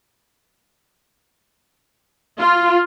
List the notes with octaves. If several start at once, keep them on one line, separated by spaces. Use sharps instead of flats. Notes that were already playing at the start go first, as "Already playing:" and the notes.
F4